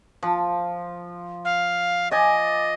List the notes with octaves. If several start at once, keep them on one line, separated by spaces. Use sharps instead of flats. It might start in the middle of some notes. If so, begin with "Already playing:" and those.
F3
F5
D5 D#5 G#5